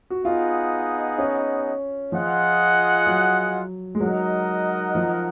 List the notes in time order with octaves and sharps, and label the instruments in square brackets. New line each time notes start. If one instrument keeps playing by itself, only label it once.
[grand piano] F#4
[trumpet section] B3 D#4 G#4 D#5 F#5 [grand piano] F4
[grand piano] C#4
[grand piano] F3 [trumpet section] F4 G#4 D#5 F#5
[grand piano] F#3
G#3
[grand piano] F#3 [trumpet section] D#4 A#4 D#5 F#5
[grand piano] F3